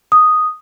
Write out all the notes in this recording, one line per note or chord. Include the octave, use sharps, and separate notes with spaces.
D#6